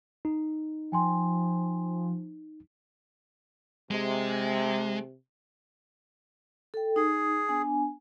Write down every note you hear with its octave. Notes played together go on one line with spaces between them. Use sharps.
D#4
F3 G5 G#5 C6
C3 G#3
A4 G5
D#4 G#4
B3 D4 G#5